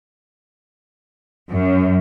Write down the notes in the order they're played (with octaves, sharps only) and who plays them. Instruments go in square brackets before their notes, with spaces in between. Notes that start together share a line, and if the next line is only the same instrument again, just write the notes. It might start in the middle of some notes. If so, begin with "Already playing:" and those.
[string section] F#2